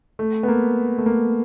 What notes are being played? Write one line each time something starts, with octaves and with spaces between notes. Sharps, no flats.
A3
B3
A#3
A3
A#3